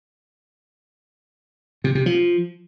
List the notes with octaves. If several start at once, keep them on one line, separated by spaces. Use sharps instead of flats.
C3
C3
F3